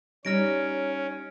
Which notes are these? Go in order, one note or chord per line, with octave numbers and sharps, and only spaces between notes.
G3 C#4 D#4 C#5 F6 A#6 D7